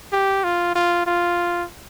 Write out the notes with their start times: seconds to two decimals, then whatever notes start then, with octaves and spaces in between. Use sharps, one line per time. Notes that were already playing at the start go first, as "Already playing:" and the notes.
0.12 G4
0.44 F4
0.75 F4
1.06 F4